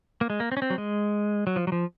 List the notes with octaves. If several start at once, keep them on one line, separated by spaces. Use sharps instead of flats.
A#3
G#3
A#3
C4
C#4
C4
F#3
G#3
F#3
F3
F#3
F3